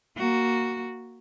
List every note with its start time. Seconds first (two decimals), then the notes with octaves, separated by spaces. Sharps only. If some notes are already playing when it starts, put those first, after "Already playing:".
0.17 A#3 F#4